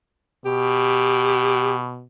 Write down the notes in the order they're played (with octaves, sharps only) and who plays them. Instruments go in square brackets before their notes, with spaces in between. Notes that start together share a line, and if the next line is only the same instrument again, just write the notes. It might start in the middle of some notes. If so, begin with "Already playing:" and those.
[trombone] B2 [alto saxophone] G4